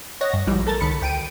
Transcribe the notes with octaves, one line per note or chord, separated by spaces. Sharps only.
C#5 D#5 F#5 A#6
G2
A#1 G#2 E3 F3 G3
A3 A4 A#4 A6
C#2 D#3 B5 C#7
D2 G5 D7 D#7